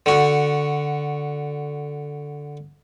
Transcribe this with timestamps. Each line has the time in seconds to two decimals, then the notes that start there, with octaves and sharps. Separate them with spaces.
0.06 D3 F#4